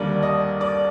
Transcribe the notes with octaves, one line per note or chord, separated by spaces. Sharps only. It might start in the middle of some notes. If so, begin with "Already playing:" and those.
Already playing: D#2 D3 G3 A#3 D5
D#5
D5